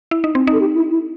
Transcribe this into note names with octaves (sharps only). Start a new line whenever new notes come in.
E4
D#4
C4
D#4 A4
G4
E4
E4